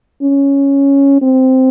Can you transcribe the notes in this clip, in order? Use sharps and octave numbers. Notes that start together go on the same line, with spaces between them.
C#4
C4